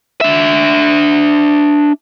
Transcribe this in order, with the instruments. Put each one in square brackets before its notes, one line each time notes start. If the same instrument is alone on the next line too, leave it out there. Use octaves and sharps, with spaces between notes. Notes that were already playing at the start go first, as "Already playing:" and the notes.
[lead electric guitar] D4 E5